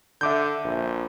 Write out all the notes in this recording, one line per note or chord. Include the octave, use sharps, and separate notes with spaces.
D3 E5 D6 G6
A#1